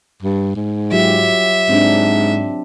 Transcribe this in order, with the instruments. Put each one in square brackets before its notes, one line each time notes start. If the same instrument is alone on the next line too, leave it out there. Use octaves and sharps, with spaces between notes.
[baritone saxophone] G2
G#2
[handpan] F#3 F4 G4 [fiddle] E5
[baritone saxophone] G#2 [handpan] C4 D4